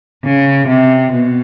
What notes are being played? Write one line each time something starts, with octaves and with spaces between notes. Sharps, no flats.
C#3
C3
B2